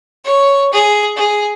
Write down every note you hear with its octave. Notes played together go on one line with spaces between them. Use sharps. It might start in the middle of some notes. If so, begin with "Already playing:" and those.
C#5
G#4
G#4